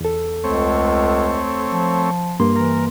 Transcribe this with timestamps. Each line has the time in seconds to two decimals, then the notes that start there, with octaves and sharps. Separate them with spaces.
0.01 E2 A4
0.44 C#2 A3 C4 C#5
1.73 F3
2.40 G2 A#3 C6
2.56 E3 A#4